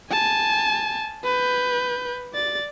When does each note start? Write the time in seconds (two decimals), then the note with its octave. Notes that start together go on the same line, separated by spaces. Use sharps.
0.11 G#5 A5
1.25 B4 G6
2.34 D5 A6